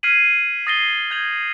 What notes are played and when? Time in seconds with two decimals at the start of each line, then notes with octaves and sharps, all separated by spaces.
0.03 F6 G#6 B6 C7 D#7 F#7
0.67 D#6 A6 A#6 C7 D#7 G7
1.11 G6 G#6 F7 F#7